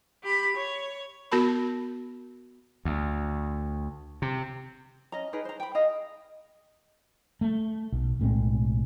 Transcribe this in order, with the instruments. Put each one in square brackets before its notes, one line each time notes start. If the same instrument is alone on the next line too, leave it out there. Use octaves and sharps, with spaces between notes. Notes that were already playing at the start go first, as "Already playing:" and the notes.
[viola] G4 B5
C#5
[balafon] B3 F#4 A#4 A5 B5
[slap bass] D2
C3
[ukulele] C#4 D#5 A#5
D#4 G#4 A#4 B4
C5 A#5
G5 B5
G#4 D#5 F5
[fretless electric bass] A3
B1
B1 A2 G#3 C4